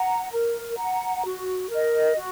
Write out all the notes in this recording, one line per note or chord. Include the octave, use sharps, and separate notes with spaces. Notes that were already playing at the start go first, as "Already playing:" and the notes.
Already playing: F#5 A#5
A#4
F#5 A#5
F#4
A#4 D#5
F#4